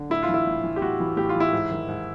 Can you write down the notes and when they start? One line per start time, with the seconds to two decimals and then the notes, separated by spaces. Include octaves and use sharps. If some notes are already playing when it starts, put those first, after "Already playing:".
Already playing: D3
0.10 A2 E4
0.23 F4
0.29 E3
0.34 E4
0.47 A2
0.64 E3
0.76 G4
0.81 A2 F#4
1.00 E3
1.17 A2 G4
1.29 F4
1.35 E3
1.40 E4
1.53 G#2
1.71 D#3
1.88 G#2